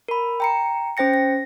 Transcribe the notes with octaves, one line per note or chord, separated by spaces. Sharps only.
A#4 B5
G5 A#5 C#7
C#4 C5 G5 A#6 C#7
A#6